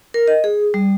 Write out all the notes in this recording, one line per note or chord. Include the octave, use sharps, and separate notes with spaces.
A#4
D#5
G#4
G3